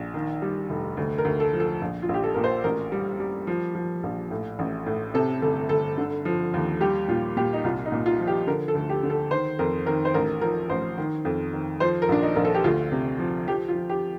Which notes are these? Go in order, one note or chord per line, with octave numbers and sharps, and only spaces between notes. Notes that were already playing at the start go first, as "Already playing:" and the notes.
Already playing: A#1
D#3
G3
F1
D2
A#4
D2
A4
F3
A4
A#1
F4
A#1
G4
A4
A#2 A#4
C5
A1 A#4
G3
G3
F3
F3
A#1
A2
A1
A2
C3 A4
G1 A4
G1 A4
D3
F3
D#2
G3 G4
A#2 F4
A#2 G4
D#4
C2 F4
D#4
A#2
F4
F3
G4
D3 A#4
A4
D2
G4
D3
A4
D#3 C5
F2 A#4
D#3 A#4
C5
A1 A#4
F3 A#4
A1 C5
D#3
F2
D#3
F3 C5
A#4
A#1 D4
D#4
A#1 A#4
A4
G4
D2 F4
C3
F3
F3 G4
F4
F3
G4